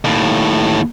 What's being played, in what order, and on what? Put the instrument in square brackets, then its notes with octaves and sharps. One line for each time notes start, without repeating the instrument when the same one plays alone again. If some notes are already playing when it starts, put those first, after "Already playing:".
[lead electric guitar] D#2 A2